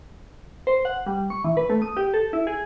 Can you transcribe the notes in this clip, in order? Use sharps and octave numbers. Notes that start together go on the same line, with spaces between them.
C5
F#5
G3
C#6
E3
B4
A3
D#6
G4
A4
E4
G#4